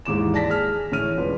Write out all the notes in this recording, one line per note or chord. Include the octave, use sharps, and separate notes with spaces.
D#2 G#2 E3 D6 E7
D5 A5 A#6 B6
G#4 F6
A2 E3 C#4 C#5 F6 D#7
E1 F4 B4